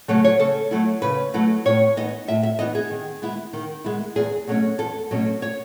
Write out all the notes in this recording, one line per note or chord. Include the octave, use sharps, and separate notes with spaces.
C#3 F#3 A3 C#5
C#5
C#3 A4
F#3 A3 E4
C#3 B4
F#3 A3 E4
A2 C#5
E3 B3 D#4 D#5
A2 E5
E5
E3 B3 D#4 D#5
G#4
D#3
G#3 B3 E4
D#3
G#3 B3 E4
E2 G#4
B2 F#3 A3 C#4
E2 A4
B2 F#3 A3 C#4
C#5